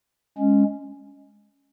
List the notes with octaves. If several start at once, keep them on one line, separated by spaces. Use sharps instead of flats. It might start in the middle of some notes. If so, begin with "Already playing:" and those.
G#3 C#4